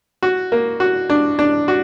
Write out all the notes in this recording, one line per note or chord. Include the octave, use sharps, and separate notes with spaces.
F#4
A#3
F#4
D4
D4
F#4